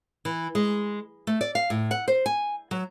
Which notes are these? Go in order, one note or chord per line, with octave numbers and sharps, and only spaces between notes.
E3
G#3
A3
D5
F5
A2
F#5
C5
G#5
F#3